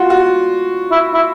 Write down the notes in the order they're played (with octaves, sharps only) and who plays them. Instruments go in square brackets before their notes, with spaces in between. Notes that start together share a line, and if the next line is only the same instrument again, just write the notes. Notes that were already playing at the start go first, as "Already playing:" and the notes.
Already playing: [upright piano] F4 F#4
F#4
[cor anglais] E4
E4